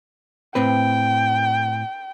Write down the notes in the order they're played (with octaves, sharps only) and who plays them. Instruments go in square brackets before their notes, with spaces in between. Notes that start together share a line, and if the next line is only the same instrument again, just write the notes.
[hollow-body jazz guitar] A2 C4 B4 [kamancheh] G5